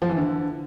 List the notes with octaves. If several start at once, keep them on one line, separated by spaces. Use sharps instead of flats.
F3
E3
D3